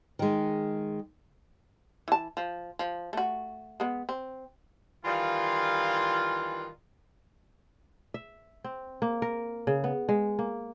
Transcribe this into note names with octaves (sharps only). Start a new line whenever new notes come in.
D#3 G#3
E3 A5
F3
F3
A3 F#4
G#3 B3
C4
D#3 E3 G3 F4
E5
C4
A#3
A#4
C#3
B3
G#3
A#3